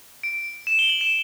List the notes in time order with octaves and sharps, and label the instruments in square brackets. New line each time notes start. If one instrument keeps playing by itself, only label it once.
[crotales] D7
E7
G7
F#7
E7